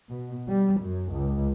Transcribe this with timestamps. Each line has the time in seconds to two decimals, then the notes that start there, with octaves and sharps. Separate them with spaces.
0.11 B2
0.48 G3
0.81 F#2
1.12 C#2